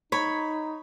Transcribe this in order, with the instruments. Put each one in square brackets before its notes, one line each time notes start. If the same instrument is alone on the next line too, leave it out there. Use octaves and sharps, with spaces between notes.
[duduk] D#4 [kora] C#5 [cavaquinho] B5